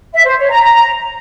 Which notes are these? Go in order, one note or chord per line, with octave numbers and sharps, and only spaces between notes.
E5
C5
C#5
A#5
A#5